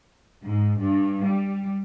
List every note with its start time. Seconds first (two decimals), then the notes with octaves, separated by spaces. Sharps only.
0.45 G#2
0.81 G2
1.24 G3